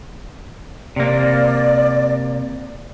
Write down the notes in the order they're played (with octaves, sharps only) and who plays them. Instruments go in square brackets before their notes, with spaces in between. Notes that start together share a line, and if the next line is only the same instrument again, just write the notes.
[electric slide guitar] C3 A#3 [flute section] D5